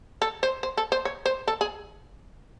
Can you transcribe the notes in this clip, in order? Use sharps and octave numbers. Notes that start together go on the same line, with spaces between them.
A4
C5
C5
A4
C5
C#5
C5
A4
G#4